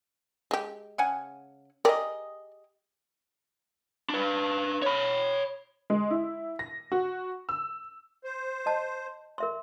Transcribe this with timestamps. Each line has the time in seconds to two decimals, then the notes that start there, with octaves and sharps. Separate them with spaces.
0.51 G#3 G4
0.98 C#3 F#5 G#5
1.85 G4 G#4 A#4 D5 D#5
4.10 D4 B4
4.82 C#5 B5
5.90 G#3
6.11 E4
6.59 A#6
6.92 F#4
7.49 E6
8.24 C5
8.66 D#5 A5
9.38 A#4 E5 C6